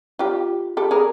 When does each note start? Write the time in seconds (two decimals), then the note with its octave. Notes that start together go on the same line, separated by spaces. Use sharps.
0.19 F4 G4
0.77 G4 A4
0.91 G#4 A#4